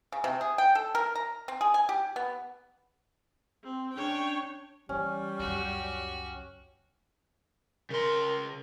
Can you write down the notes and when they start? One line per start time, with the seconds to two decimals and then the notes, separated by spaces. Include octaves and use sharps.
0.12 C#3
0.24 C3
0.41 G#4
0.58 G5
0.75 A4
0.95 A#4
1.15 A#5
1.48 C4
1.61 G#4
1.74 G#5
1.89 G4
2.16 B3
3.64 C4
3.94 C#4 D4 C#5 G5
4.89 E3 G3 C#4
5.39 C#2 F#2 F#4 G4
7.90 C#3 A#4 C6